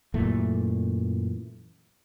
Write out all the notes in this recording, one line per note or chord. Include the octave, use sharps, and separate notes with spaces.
F#2 A#2 E3 A3